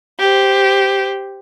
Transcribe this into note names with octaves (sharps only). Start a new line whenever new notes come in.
G4 C5